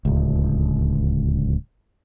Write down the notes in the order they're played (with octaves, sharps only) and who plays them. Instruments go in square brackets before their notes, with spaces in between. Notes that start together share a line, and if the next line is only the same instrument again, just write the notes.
[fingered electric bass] D1 C#2